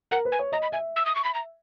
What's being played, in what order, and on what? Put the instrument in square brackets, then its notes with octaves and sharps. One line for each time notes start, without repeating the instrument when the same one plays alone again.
[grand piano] A#4 [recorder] F#5
[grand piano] B4
[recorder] G#5
[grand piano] C#5
[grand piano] D#5 [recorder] A#5
[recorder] B5
[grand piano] E5 [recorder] G#5
[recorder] E6
D#6
C#6
B5
A#5